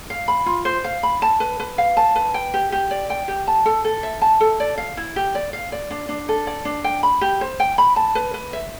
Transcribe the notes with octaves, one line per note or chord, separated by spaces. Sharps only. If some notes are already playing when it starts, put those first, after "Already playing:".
F5
B5
F4
C5
F5
B5
A5
B4
B4
F5
A5
B4
G5
G4
G4
D5
G5
G4
A5
A4
A4
E5
A5
A4
D5
F5
E4
G4
D5
F5
D5
D4
D4
A4
D5
D4
G5
B5
G4
C5
G5
B5
A5
B4
B4
E5